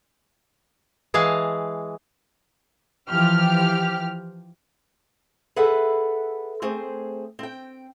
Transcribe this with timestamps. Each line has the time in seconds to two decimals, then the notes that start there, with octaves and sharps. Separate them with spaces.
1.14 E3 G#3 G#4 F5 G#5 A5
3.09 E3 F3 G4 F6
5.56 G#4 A4 B4 E5 F#5
6.62 A3 C4 G#4 C5
7.39 C4 G5